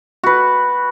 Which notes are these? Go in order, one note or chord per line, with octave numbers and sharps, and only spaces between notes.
F#4 B4